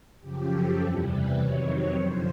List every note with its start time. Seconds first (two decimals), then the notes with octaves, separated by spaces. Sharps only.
0.21 F#2 C#3 F3 G4
0.50 A4
0.79 E2 C3 E3 G3
1.08 B4
1.37 F2 C3 D#3 F#3 C#5
1.96 F#2 D3 F3 C5